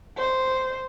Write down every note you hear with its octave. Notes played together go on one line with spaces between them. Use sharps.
C5